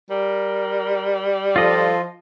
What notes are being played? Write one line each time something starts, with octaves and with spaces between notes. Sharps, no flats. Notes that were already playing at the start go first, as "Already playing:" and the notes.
G3 A#4
F3 F4 A4 D#5